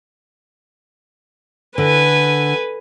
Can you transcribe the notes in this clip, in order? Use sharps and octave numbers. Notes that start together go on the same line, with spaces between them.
D3 B4 G#5